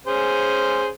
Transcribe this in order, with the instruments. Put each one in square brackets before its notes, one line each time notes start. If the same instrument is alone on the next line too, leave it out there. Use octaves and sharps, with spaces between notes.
[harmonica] C#4 G#4 C5